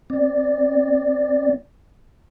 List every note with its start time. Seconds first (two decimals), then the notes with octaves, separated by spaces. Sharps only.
0.10 C4 D5